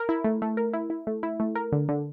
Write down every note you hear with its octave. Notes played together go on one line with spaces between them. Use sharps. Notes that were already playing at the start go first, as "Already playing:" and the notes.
Already playing: A#4
E4
A3
A3
A#4
E4
E4
A3
E4
A3
A#4
D3
D3